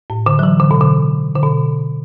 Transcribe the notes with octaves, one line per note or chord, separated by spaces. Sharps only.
A2
D3
F#3
E3
D3
B2
D3
D3
B2